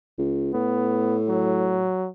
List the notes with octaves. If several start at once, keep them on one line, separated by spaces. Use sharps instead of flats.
C#2
A2 B3
F#3